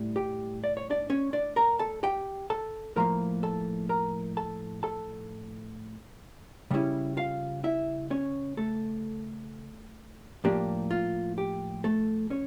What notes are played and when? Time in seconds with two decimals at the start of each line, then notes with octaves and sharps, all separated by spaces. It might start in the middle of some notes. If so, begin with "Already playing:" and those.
Already playing: A2 G3
0.16 G4 G5
0.64 D5
0.77 C#5
0.90 D4 D5
1.10 C#4 C#5
1.33 D4 D5
1.56 A#4 A#5
1.79 A4 A5
2.03 G4 G5
2.50 A4 A5
2.96 A2 F3 A#3 A#4 A#5
3.43 A4 A5
3.89 A#4 A#5
4.37 A4 A5
4.83 A4 A5
6.71 C#3 G3 C#4 E4
7.17 F4 F5
7.64 E4 E5
8.11 C#4 C#5
8.57 A3 A4
10.44 A2 F3 A#3 D4 G4
10.91 F4
11.38 G4
11.84 A3 A4
12.30 C#4 C#5